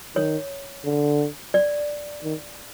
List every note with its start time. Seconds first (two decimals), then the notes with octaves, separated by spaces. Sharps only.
0.16 D#3 C#5
0.85 D3
1.54 D5
2.24 D#3